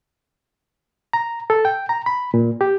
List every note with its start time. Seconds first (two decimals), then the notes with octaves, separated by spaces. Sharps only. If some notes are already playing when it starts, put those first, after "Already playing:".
1.13 A#5
1.50 A4
1.65 G5
1.89 A#5
2.06 B5
2.34 A#2
2.61 G4